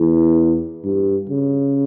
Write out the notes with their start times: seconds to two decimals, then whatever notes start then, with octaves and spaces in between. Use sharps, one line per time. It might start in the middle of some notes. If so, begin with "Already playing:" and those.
Already playing: E2
0.85 G2
1.30 C#3